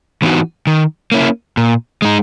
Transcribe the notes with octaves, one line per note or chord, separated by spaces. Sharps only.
E3 B3 D#4 F#4
D#3
A#3 C#4 E4
A#2
G#3 D#4